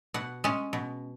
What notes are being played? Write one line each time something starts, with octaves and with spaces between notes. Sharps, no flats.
B2 F#5
G#3 C#4
B2